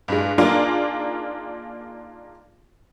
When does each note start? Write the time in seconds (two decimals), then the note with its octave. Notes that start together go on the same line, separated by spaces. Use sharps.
0.08 G2 G#3
0.38 A#3 D4 D#4 F4 G#4 A#4